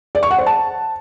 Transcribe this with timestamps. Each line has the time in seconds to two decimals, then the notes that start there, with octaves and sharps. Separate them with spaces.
0.15 D5
0.23 C#6
0.31 F#5
0.39 C5
0.46 A5